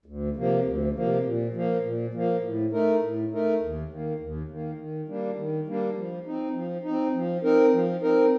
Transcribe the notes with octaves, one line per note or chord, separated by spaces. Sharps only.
D2
C3 F3 A#3
D2
C3 F3 A#3
A#2
F3 A#3
A#2
F3 A#3
A2
A3 D#4 A#4
A2
A3 D#4 A#4
D#2
D#3 A#3
D#2
D#3 A#3
D#3
G3 A#3 D4
D#3
G3 A#3 D4
F3
C4 D#4
F3
D#4
C4
F3
C4 D#4 A#4
F3
C4 D#4 A#4